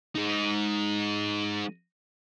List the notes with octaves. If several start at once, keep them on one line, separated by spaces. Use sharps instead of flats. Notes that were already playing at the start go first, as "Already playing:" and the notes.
G#3 D#4